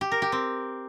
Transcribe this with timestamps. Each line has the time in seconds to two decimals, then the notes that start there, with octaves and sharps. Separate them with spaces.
0.01 G4
0.12 A#4
0.22 G4
0.32 C4